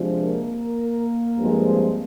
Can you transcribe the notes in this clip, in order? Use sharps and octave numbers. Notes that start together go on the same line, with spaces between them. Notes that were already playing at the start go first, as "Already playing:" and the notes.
Already playing: C3 F3 G#3 D4
A#3 A#4
G2 F3 G#3 C4